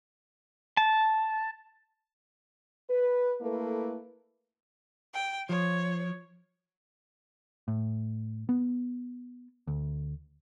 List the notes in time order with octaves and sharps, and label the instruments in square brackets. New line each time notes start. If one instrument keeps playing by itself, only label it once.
[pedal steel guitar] A5
[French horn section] B4
A3 A#3 E4 A4 B4
[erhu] G5
[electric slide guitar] F3 [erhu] C#5
[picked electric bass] A2
B3
D2